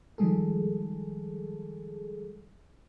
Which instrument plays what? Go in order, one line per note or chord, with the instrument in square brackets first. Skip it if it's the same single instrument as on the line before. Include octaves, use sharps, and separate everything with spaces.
[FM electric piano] D#3 F3 G3 G#3 G#4 A4